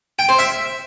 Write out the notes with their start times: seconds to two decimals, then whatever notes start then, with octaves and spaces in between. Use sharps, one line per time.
0.19 G5
0.29 C5
0.39 E5